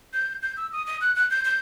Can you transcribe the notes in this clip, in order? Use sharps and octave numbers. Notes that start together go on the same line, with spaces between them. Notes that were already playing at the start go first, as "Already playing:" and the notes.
G6
G6
E6
D#6
D#6
F#6
F#6
G6
G6